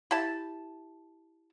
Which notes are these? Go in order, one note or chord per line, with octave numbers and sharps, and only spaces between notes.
E4 G4 A5